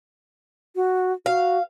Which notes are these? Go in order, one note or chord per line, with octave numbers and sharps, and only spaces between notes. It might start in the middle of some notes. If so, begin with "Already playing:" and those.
F#4
F#4 F5